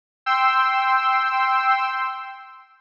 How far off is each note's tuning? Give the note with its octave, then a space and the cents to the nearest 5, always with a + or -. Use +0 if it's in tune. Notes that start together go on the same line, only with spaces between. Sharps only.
G5 +0 C6 +0 E6 +0